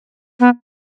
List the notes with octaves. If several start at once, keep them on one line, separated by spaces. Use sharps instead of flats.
B3